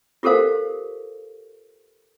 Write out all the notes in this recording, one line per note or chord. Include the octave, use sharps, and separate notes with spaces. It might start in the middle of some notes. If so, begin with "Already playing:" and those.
F4 G4 A4 A#4 C5 F5